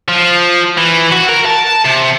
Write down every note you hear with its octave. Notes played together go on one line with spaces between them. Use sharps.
F3
E3
F#4
A#4
A5
C3